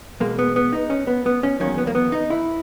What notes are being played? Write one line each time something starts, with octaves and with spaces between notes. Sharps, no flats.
E2 B2 G#3 A#3
B3
B3
D#4
C#4
B3
B3
C#4
E2 D#3 F#3 A#3 C#4
B3
A#3
B3
D#4
E4